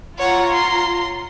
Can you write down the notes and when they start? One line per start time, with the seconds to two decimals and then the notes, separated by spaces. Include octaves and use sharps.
0.18 F4 C#5 F#5 A#5
0.52 C6